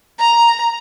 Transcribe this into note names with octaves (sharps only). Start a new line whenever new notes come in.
A#5